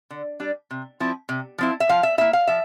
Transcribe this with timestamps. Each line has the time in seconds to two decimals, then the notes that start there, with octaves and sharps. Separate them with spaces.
0.10 D3
0.40 G3 D4
0.71 C3
1.00 F3 C4 E4
1.29 C3
1.58 F3 C4 E4
1.80 E5
1.89 F3 F5
2.03 E5
2.18 A#3 E4 E5
2.33 F5
2.47 F3 E5